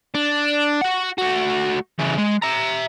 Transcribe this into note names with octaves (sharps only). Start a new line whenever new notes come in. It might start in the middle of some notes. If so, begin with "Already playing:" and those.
D4
F#4 F#5
A3 F#4
C#3 E3
G#3
E5 A#5